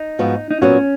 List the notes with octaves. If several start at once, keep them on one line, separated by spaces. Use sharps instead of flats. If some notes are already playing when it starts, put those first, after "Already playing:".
Already playing: D#4
G#2 F3 B3 F#4
D#4
A#2 F#3 B3 C#4 F#4